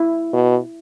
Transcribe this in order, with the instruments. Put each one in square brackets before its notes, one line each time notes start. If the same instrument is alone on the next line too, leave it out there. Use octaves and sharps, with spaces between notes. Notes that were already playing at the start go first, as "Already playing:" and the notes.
Already playing: [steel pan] E4
[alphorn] B2